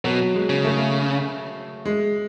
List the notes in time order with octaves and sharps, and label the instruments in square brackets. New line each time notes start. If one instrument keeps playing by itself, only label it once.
[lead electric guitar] B2 [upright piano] F#3
[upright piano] G#3
[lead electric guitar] C#3
[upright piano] A3
G#3